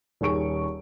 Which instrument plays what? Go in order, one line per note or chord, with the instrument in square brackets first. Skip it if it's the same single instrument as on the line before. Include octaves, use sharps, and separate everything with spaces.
[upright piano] D#1 D#2 G#4 C#6 D7